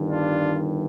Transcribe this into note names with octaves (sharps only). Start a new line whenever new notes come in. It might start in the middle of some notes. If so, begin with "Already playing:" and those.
Already playing: G1 G2 D#3
D4 F4